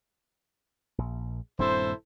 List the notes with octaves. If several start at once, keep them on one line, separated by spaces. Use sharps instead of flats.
A#1
D#1 G2 C4 E4 A4 C5